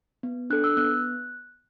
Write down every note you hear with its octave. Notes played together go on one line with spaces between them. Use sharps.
B3
D4 A4 F#6
E6
B3 F#6